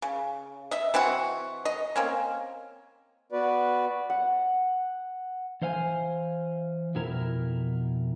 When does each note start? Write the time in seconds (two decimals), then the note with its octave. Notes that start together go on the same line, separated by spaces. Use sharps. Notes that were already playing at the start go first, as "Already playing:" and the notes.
0.02 C#3
0.71 D#5 E5
0.94 E3 C4 E4 F#4
1.65 D#5
1.96 A#3 C4 C#4
3.32 B3 F#4 B4 D5
4.10 F#5
5.61 E3 C5 F5 G#5
6.95 F2 B2 E4 A#4